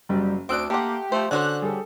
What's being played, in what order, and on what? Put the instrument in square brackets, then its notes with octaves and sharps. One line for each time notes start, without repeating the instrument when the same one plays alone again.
[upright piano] F#1 F#3 [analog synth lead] G3
[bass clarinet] D2 [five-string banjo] C4 D4 [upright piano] D#6 E6 F#6 [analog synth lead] D7
[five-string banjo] A3 F#5 [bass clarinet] A#3 [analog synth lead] G4 [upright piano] C6 D6
[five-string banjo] F3 C5 [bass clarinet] A3
[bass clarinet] D3 [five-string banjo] C#4 F#4 C5 [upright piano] D4 [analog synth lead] F#6
[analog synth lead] G3 [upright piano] G#4 A4